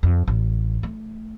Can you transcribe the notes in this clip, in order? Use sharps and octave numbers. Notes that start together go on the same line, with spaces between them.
F2
A1
A3